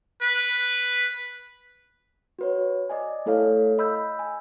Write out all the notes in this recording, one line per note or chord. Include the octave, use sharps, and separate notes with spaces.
B4
F#4 B4 C#5
D5 D#5 G#5
A3 E4 A4 C#5 F5
D#5 B5 E6 G6
G#5